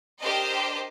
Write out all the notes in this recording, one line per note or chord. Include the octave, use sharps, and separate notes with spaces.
D4 G4 A#4 C5 D#5